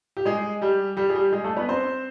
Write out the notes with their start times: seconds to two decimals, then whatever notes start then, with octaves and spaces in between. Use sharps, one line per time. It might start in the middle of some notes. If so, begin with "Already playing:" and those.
0.17 G4
0.25 G#3 G#4
0.62 G3 G4
0.97 G3 G4
1.10 G#4
1.15 G3 G4
1.32 G#3 G#4
1.44 A3 A4
1.57 B3 B4
1.69 C4 C5